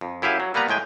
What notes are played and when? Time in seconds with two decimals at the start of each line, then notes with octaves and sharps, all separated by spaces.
0.01 F2
0.22 F#2 E4 G4 F5 G#5
0.40 F#3
0.54 G3 A#3 B3 B4 A#5
0.69 A2 G#3 G5 G#5